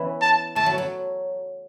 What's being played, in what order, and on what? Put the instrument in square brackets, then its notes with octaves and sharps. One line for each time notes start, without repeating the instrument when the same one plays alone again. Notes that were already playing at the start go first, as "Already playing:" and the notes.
Already playing: [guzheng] E3 B3 C#4
[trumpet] A5
[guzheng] A3 [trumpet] A5
[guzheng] F#3
F#3